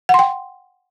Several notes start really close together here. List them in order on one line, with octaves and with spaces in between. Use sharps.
F#5 C6 G5